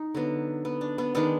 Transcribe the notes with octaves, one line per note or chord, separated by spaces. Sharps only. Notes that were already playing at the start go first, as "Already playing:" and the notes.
Already playing: D#4
D3 F#3 B3
B3
D4
B3
D#3 G#3 B3 D4